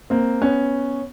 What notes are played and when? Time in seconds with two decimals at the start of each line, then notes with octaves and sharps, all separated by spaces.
0.10 A#3 C4
0.41 B3 C#4